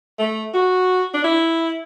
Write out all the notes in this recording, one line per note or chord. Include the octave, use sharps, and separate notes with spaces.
A3
F#4
D4
E4